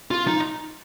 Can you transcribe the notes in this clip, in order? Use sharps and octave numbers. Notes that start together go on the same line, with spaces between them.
F4
D#4